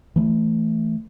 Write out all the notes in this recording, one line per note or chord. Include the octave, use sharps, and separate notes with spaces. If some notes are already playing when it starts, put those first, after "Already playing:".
E3 A3